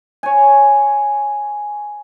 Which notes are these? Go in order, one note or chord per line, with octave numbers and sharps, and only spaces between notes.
C#5 G#5